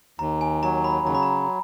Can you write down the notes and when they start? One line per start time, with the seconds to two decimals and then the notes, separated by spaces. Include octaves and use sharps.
0.19 D#2 A#5
0.41 G#5
0.63 F#3 A#5
0.84 B5
1.07 C#3 A#5
1.15 B5
1.23 A#5